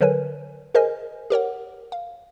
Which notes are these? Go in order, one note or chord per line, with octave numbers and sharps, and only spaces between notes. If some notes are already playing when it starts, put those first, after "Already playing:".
D3 F#3 A#4 B4 C#5 G#5
G#4 A#4 C5 D#5 G#5
G4 A#4 C#5 F#5
F5